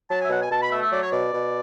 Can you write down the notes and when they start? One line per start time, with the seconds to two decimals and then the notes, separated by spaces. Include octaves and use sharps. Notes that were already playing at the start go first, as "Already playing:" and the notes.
0.10 F#3 A5
0.20 G#5
0.25 E5
0.30 B2 F#5
0.41 G#5
0.51 B2 A5
0.61 B5
0.71 A3 E5
0.82 E5
0.91 F#3 D5
1.02 C#5
1.11 B2 D5
1.34 B2